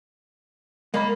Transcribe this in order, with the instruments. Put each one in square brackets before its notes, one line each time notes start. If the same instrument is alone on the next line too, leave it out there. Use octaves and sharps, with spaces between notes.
[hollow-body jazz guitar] G#3 D5 B5 [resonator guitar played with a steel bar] A#3